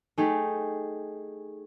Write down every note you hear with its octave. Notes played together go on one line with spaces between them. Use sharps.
A3 D#4 G4 G#4